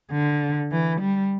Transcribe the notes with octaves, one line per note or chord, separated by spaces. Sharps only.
D3
E3
G3